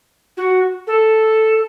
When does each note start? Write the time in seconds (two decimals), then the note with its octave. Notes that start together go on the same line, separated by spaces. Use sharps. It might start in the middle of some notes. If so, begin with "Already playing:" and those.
0.37 F#4
0.87 A4